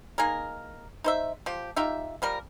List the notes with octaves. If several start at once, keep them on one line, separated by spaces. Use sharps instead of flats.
A#3 D#4 G#4 A#4
D#4 C5 E5
F3 G4
D#4 F4 G4 E5
F3 G3 A#4